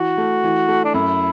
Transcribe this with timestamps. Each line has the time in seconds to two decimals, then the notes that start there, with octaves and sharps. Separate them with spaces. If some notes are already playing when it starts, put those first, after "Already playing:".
Already playing: E3 F#4
0.18 A3
0.44 E3
0.69 A3
0.85 D4
0.94 F#2 E4